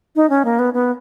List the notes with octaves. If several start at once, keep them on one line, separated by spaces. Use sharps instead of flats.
D#4
C#4
A#3
B3
B3